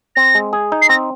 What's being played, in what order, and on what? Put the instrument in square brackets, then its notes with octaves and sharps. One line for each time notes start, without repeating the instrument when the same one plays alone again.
[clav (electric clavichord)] C4 [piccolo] A#6
[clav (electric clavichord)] G#3
G#4
D#4
[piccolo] C7
[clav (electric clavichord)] C4 [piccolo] A#6